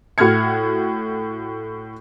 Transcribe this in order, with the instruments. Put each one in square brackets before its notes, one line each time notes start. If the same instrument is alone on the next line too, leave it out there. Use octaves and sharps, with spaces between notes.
[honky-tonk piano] A2 F#4 F6 G#6 C#7